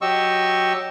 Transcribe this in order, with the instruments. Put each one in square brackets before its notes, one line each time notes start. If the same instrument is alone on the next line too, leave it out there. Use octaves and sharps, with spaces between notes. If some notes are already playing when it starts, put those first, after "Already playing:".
[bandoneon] F#3 G4 D#5 C#6 E6